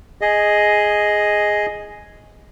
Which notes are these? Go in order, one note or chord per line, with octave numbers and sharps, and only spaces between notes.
G#4 D#5